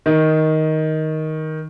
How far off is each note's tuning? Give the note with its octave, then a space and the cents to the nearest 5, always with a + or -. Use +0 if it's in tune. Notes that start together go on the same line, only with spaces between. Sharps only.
D#3 +10